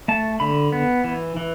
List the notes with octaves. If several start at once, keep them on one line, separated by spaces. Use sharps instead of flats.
A3 A5
D3 B5
B3
E3
E3